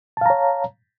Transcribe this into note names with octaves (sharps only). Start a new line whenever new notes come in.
C#5 F5 A5 A#5